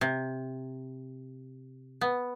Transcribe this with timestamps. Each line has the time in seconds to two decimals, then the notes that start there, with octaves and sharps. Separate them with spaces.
0.01 C3
2.01 B3